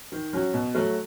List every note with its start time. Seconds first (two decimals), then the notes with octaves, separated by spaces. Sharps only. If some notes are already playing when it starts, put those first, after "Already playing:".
0.12 D#3
0.33 F#3 C#4 F#4
0.54 B2
0.75 F#3 A3